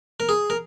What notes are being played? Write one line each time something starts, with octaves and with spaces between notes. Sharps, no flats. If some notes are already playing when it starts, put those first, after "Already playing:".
A#4
G#4
A#4